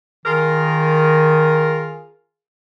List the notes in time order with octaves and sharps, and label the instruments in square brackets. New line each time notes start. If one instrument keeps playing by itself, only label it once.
[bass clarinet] D#3 [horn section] F4 G#4 A#4